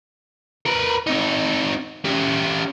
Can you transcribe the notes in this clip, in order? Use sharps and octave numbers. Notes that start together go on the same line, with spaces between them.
A#4 B4
C4 D#4
C#4 G4